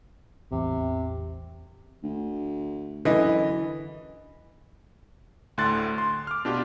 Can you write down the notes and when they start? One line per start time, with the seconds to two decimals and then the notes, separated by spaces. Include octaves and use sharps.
0.51 A1 E2 C3
2.03 D2
3.05 F#2 D3 E3 D#5
5.58 D2 A2 D3 C6 F#6 A6
5.98 C6
6.27 D6 F6
6.45 B2 D4 F4 G4